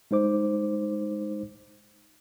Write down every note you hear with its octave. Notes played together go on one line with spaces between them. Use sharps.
G#3 D#4 C5 D6